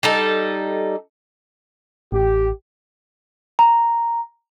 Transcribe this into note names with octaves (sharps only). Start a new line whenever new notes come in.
G3 D#4 A4
A1 G4
A#5